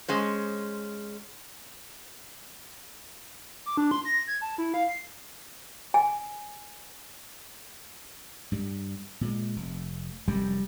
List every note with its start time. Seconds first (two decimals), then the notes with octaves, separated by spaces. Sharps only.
0.08 G#3 C#4 C5
3.66 D6
3.77 D4
3.91 C6
4.05 A#6
4.27 G#6
4.41 A5
4.58 E4
4.74 F5
4.88 C7
5.94 G#5
8.52 G2 G3
9.21 A#2 G#3
9.56 F1
10.28 F1 F#2 G3